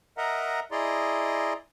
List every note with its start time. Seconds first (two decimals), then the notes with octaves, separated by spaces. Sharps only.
0.17 A#4 D#5 E5 F#5 A#5
0.71 E4 G#4 D5 D#5 A#5 C6